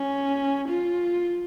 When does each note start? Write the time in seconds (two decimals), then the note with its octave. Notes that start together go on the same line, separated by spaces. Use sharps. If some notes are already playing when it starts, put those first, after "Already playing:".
Already playing: C#4
0.69 F4